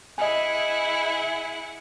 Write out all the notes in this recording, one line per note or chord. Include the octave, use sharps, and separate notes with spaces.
E4 G#4 D#5 F#5 G#5